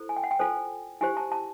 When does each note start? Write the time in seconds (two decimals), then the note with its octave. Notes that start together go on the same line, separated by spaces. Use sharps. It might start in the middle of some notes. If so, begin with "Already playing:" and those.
Already playing: E4 A4 C5
0.09 G#5
0.17 G5
0.24 F#5
0.31 G5
0.39 F4 A4 C5 G#5
1.01 E4 G4 C5 G#5
1.17 A5
1.32 A5